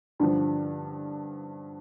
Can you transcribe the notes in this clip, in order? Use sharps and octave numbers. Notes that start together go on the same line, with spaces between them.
G2 D3 F3